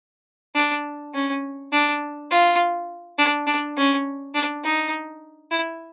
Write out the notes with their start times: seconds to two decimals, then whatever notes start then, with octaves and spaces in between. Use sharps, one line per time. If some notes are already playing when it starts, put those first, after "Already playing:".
0.55 D4
1.14 C#4
1.72 D4
2.31 F4
3.18 D4
3.47 D4
3.77 C#4
4.34 D4
4.64 D#4
5.51 E4